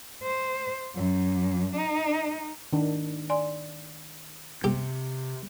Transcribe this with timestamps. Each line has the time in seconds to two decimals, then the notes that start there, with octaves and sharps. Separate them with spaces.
0.23 C5
0.95 F#2
1.76 D#4
2.73 D#3 D4
3.30 D5 G#5 C6
4.64 C3 G4